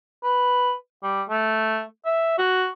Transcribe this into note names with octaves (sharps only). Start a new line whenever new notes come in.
B4
G3
A3
E5
F#4